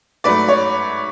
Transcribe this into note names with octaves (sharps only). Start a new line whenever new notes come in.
G#2 F#3 A3 B4 D5
C#5